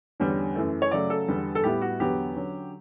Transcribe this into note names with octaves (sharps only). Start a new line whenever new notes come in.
E2 D3 G3 C#4
F#2 E3 A3
C#5
C#3 F#3 A3 D5
A4
E2 D3 G3 B3
A4
A2 G3 B3 E4 G4
F#4
E2 D3 F#3 B3 G4
D3 F#3 C#4